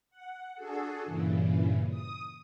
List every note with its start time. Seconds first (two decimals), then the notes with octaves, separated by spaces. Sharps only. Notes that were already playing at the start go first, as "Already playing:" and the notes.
0.10 F#5
0.55 D4 F#4 G#4 A4
1.05 G2 A#2 C#3 E3
1.89 D#6